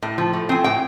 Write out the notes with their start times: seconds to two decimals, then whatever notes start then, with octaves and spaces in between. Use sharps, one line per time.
0.02 A2
0.18 F3
0.33 A3
0.49 C4 G#5
0.64 A2 G5